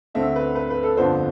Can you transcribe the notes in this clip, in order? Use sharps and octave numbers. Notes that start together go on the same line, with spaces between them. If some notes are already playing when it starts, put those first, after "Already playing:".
D2 D3 A3 C4 E5
B4
B4
B4
A4
G1 F2 D3 F3 B3 C5